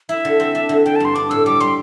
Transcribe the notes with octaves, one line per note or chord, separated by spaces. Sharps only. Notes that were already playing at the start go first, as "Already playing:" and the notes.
E4 E5
D3
C4
D4
D3
D3 G5
A5
G2 C6
D4 D6
A2 E6
G3 D6
G3 C6